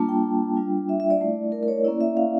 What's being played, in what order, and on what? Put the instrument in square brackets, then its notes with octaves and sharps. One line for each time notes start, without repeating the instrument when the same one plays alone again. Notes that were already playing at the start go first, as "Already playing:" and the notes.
Already playing: [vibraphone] G3 A#3 D4 F4 A5
G5
G3 D4 F4
E5
E5
D5
A3 E4
A#4
A#4
C#5
A#3 C#4 E4 D5
E5
F5